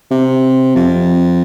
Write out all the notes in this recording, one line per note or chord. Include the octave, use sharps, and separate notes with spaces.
C3
F2